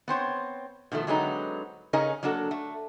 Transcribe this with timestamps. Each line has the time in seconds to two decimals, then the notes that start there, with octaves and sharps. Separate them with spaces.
0.08 B3 C4 C5 C#5
0.92 B2 D#3 F3 A3
1.07 D3 F#3 G#3 B3 C4 D#4
1.93 C#3 C#4 D#4 G#4 A#4 D#5
2.23 F#3 A#3 D4 F#4 A4
2.51 A3